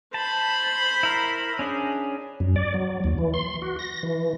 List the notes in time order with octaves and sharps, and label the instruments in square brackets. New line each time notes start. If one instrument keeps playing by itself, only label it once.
[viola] C5 B5 [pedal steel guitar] A5
[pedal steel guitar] E4 A#4
C#4 D4 G#4
[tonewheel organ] F#2
D5
F#3
D#2
E3
C6
F#4
A#6
E3